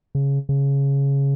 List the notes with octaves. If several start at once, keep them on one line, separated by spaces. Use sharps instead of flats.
C#3
C#3